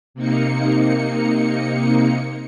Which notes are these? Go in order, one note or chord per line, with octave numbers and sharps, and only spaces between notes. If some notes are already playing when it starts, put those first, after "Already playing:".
C3 A#3 D#4 C#7